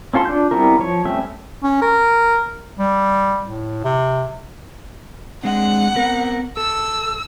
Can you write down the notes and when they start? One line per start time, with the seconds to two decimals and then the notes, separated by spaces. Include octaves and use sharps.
0.13 C4 C#4 F4 A4 C6
0.25 D4 F4 G6
0.51 G3 B3 C4 E4 A#4
0.79 F3 C#5
1.05 G3 A3 C4 C#4 E5
1.63 C#4
1.82 A#4
2.78 G3
3.47 A2
3.84 C3
5.43 G#3 C4 D4 F#5
5.95 B3 C4 A#4
6.57 A4 E6